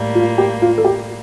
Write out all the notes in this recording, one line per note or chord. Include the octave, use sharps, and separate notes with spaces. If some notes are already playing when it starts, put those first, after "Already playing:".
Already playing: A2 G3 A#3
F4
G4
F4
A4
G4